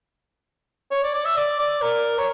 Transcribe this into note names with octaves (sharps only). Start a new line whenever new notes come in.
C#5
D5
D5
E5
D5
D5
A#4
C#5